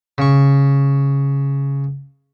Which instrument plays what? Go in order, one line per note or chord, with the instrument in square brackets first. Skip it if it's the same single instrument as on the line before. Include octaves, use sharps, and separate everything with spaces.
[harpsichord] C#3 C#6